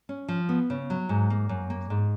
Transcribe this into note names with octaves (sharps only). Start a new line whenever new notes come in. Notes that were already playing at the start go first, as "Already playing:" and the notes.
C#4
F3
B3
C#3
F#3
G#2
A#3
F#2
A#3
G#2